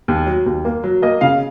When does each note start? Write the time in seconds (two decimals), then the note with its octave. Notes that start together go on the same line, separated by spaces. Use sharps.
0.08 D#2
0.26 F#3
0.46 D#2
0.65 A#3
0.84 F#3
1.02 A#3 D#5
1.21 C#3 F5